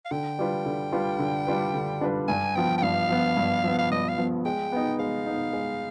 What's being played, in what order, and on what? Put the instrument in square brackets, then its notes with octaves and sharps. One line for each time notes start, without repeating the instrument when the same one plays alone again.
[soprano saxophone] F5
[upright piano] D3 [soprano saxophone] G5
[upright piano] G3 D4 F4 B4
D3
G3 D4 F4 B4
D3
G3 D4 F4 B4
D3
G3 D4 F4 B4
[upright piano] G2 [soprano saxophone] G#5
[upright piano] F3 B3 [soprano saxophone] G5
[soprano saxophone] G5
[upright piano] G2 [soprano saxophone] F5
[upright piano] F3 B3
G2
F3 B3
[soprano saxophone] F5
[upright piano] G2 [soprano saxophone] D#5
[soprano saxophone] F5
[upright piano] F3 B3
[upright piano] G#3 [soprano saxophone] G5
[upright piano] B3 D#4
[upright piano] G#3 [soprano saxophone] F5
[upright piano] B3 D#4
G#3